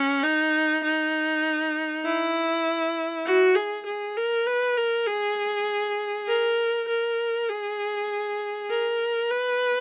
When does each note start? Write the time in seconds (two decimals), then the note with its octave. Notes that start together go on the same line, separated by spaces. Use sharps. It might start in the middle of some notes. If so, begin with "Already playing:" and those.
Already playing: C#4
0.23 D#4
0.83 D#4
2.05 E4
3.25 F#4
3.55 G#4
3.86 G#4
4.16 A#4
4.46 B4
4.77 A#4
5.06 G#4
6.28 A#4
6.88 A#4
7.49 G#4
8.70 A#4
9.30 B4